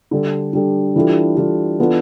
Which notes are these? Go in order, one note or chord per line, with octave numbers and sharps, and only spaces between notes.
D3 G3 D4 A4
D3 G3 D4 A4
E3 G3 D4 F4 A4
E3 G3 D4 F4 A4
E3 B3 D4 F4 A4